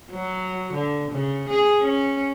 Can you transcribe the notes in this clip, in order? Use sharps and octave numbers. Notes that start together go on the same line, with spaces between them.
F#3
D3
C#3
G#4
C#4